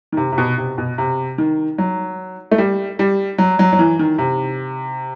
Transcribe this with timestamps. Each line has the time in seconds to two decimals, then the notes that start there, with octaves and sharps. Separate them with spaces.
0.12 D#3
0.17 C3
0.32 C3
0.38 B2
0.58 C3
0.78 B2
0.98 C3
1.38 D#3
1.78 F#3
2.51 A3
2.58 G3
2.99 G3
3.38 F#3
3.59 F#3
3.73 F#3
3.79 E3
3.99 D#3
4.18 C3